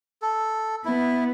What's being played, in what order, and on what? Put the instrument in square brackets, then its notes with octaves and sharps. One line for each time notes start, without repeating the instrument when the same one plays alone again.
[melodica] A4
[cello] B3 [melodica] E4